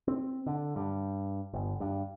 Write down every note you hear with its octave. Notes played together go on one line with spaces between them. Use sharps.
C4
D3
G2
G1
G2